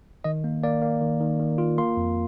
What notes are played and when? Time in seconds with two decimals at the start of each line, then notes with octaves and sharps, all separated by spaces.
0.24 D#3 D#5
0.44 A#3
0.63 A#3 D5
0.82 A#3
1.01 D#3
1.20 D#3
1.39 D#3
1.58 F4
1.78 A#3 C6
1.97 F2